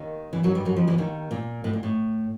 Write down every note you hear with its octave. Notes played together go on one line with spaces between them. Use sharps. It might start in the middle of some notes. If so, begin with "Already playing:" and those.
Already playing: D#2 D#3
E2 E3
F#2 F#3
G2 G3
F#2 F#3
F2 F3
E2 E3
D#2 D#3
A#2
A2
A#2
A2